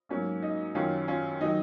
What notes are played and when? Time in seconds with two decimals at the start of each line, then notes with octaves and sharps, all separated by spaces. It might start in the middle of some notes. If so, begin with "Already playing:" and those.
0.09 G#2 F#3 A#3 C#4
0.42 D#4
0.75 F#2 D#3 F#3 C#4 F4
1.08 C#4 F4
1.41 D#3 F#3 D#4